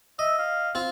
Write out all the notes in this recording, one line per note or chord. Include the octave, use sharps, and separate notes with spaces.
D#5 E5
F5
C4 F4